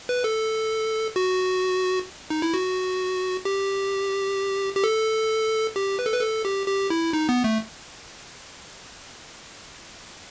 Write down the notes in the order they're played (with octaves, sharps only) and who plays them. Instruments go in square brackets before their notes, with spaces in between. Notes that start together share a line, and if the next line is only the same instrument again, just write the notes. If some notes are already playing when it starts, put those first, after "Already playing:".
[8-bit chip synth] B4
A4
F#4
D#4
E4
F#4
G4
G4
A4
G4
B4
A4
B4
A4
G4
G4
E4
D#4
B3
A3